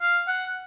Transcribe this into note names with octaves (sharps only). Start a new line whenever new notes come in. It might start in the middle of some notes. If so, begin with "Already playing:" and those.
F5
F#5